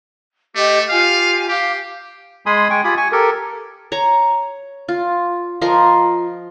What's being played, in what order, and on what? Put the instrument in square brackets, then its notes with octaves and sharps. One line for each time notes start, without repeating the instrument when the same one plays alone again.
[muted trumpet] A3 [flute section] G4 D#5 D6
[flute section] F4 G4 G#5 [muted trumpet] F5
[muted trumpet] G4 [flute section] F5 D6
[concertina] G#3 G#4 G#5 B5 C6 D#6
G#3 G5 G#5 C#6
F4 G4 G#5 B5 D#6
G#5 C#6
G4 A4 A#4
[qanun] C#5 A#5
F4
F3 A#4 D#5 C6